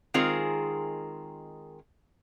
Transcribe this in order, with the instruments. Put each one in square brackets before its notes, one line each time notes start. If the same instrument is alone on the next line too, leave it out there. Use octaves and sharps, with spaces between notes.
[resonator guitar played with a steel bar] D#3 G#3 C4 F4 G#4 A#4